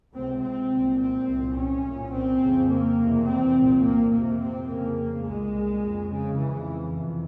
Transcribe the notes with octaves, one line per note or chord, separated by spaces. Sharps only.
C#2 C3 C4
C4
A#2
C2
C4
C2 A#2
C#4
C2 A#2
C4
F2 C#3
A#3
E2 C3
C4
C2 A#2
A#3
F2 C3 A#3
C4
F2 C#3 A#3
C2 A#2 G#3
F2 C#3
C#3
F2 C#3 E3
F2 C3